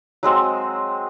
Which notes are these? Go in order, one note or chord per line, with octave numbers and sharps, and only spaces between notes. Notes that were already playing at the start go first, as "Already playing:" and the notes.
F#3 G#3 C4 D#5